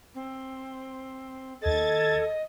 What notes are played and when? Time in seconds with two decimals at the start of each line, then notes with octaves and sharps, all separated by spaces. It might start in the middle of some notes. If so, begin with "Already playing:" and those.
0.15 C4
1.62 D#2 A4 D#5 G#6 A6